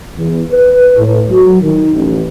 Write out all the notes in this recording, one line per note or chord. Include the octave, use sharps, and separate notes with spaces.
E2
B4
A2
F#3
D#3
A1